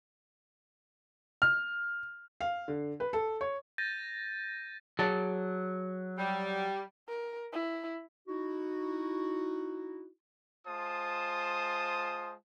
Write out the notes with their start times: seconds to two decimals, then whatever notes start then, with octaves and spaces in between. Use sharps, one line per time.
1.42 F6
2.41 F5
2.68 D3
3.00 B4
3.13 A4
3.41 C#5
3.78 G6 A6 A#6 D#7
4.99 F#3 G#4 D5 A5
6.18 G3
7.08 A#4
7.53 E4
8.28 D#4 E4 F#4
10.67 G#3 F4 C5 A5 D#6